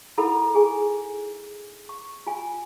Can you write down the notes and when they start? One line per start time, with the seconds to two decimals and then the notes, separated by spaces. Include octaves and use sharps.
0.17 D#4 E4 A4 A#4 F#5 B5
0.54 G#4 G#5
1.89 C#6
2.27 F4 G#5